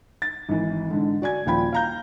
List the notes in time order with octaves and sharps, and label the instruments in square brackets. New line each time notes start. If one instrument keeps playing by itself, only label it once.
[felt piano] A6
G#1 E3
G#2 D3
F#4 D5 G#5 G#6
D#1 F3 G5 B5 G#6
F5 A#5 G6